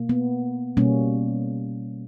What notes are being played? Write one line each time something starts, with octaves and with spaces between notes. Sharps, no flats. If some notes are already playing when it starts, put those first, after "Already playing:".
Already playing: B2 A#3
B3
B2 G3 A#3 C#4